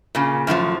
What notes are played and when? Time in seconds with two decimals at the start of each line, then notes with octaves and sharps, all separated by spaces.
0.15 A#2 C#3
0.47 F#2 A2 D3 F3